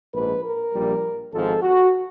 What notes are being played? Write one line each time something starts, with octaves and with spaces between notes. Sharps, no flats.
A#1 G#2 F3 B4
A#4
A#1 A#2 G3
G#1 G#2 F3 A4
F#4